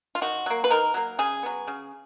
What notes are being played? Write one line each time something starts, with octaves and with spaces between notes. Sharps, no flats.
F4
D#3 F#4
F#3 A#3
B4
D#3 A#4
F#3 A#3
C#3 G#4
F#3 B3
C#3